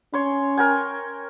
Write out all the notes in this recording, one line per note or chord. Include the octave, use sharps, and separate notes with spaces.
C#4 C#5 C6
A#4 G5 G#5